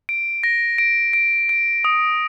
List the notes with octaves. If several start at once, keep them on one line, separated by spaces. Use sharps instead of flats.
D7
A#6
D7
D7
D7
D#6